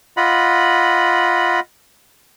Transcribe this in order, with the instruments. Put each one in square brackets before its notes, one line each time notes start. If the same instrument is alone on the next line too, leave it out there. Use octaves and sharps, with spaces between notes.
[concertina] F4 D#5 F#5 B5